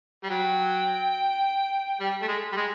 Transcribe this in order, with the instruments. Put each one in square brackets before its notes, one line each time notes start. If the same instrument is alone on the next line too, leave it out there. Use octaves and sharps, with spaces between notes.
[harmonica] G3
[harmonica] F#3 [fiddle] G5
[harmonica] G3
A3
G#3
G3
G#3